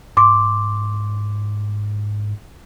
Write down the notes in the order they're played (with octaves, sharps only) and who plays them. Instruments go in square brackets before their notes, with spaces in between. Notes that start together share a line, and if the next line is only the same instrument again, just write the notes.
[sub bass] G#2 [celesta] C6 D6